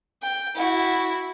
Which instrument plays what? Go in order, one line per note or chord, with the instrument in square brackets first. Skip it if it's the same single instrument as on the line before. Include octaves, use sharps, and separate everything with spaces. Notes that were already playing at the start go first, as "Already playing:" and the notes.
[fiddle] G5
E4 F#4